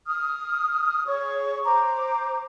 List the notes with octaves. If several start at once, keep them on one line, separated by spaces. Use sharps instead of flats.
D#6 F6
G#4 C#5 C#6
C5 A#5 D6